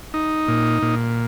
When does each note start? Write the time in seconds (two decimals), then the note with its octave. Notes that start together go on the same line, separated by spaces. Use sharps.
0.14 D#4
0.48 A#2
0.82 A#2